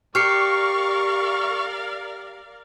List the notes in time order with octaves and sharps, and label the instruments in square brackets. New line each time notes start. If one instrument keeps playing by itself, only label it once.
[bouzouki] G4 [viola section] A#4 D5 F5 [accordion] C#6 [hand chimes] F6 C7 C#7